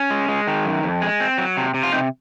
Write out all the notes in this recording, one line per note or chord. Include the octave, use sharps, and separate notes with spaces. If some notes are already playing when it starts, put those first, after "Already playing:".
Already playing: C#4
G#3
G#3
D#3
F#2
F2
G#3
C4
F#3
C3
C3
F4
C3 C4 D#4